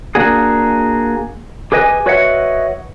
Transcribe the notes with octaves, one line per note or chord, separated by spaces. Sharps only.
A#3 D4 F#4 G#4
G4 G#4 B4 D#5 G#5
F#4 B4 C#5 D#5 E5 F#5